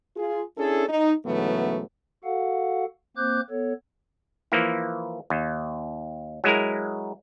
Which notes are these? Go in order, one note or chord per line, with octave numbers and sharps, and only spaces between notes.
F4 G#4
C#4 D4 E4 G#4 A4
D#4
G#2 C#3 E3 F#3 A3 B3
F#4 A4 F5 F#5
A#3 C4 C5 D6 F#6 G6
B3 A4 C#5
E3 F3 A#3 E4
D#2
F#3 G#3 E4 A#4